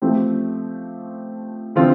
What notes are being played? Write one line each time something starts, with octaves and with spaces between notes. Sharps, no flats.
F3 A3 C4 G4
D3 F3 C4 F4